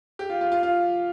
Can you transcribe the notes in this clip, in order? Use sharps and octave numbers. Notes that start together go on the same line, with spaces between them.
G4
F4
F4
F4
F4